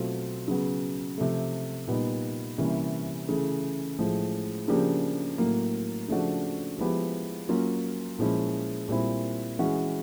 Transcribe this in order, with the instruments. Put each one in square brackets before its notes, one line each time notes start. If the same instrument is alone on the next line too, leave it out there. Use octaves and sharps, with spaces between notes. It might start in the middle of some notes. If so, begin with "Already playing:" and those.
Already playing: [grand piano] B2 F#3 A3 C4 F4
C#3 F#3 B3
C3 F3 A3
A#2 G3 B3 D#4
C3 E3 G3 A#3 C#4
C#3 E3 A3
A2 F3 G#3
C#3 F3 A#3 D4 G4
A2 F#3 A#3
C#3 F3 A3 D4 F#4
F3 G#3 B3 E4 G4
F#3 A#3 C#4 F4
A#2 F3 G#3 C#4 E4
A#2 G3 C4 E4
E3 G#3 C#4 F#4